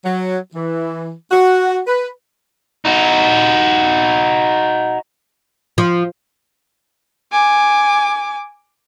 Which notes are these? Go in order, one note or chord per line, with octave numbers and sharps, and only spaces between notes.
F#3
E3
F#4
B4
D#4 F#4
F3
G#5 D6